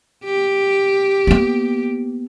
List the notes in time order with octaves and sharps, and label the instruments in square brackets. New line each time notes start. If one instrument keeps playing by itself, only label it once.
[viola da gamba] G4
[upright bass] A#3 B3